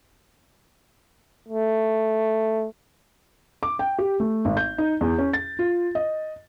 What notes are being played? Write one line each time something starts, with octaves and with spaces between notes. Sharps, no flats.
A3
D6
G5
G4
A3
G#1
G6
D#4
E2
C#4
A6
F4
D#5